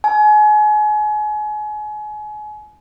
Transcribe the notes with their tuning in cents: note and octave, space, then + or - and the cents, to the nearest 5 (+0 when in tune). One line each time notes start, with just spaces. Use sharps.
G#5 +30